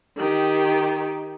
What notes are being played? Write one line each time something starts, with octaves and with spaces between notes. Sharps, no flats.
D#3 G4